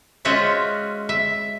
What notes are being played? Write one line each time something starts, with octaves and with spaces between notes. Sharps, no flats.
G#3 C#4 F4 F#4 C5 E5
E5